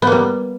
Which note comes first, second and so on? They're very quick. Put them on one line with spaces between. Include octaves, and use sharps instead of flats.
B3 A#3 G3